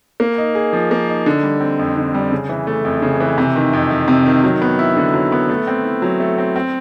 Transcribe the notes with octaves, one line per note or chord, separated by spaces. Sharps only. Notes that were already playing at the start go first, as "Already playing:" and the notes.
A#3
D#4
G#4
F3
A#3
D#4
D3
G3
C4
F2
D3
G3
C#3
E3
A3
F2
C#3
E3
C3
D#3
F2
F2
C3
D#3
F#3
B3
E4
D3
F#3
B3
A3
C4
E4
F#3
A3
C4
C4